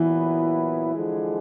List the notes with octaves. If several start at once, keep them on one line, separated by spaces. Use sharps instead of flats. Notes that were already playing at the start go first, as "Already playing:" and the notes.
Already playing: A#2 E3 F#3 B3 E4
D3 F3 G#3